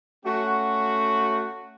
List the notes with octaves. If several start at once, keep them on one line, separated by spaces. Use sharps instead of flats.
A3 C#4 F#4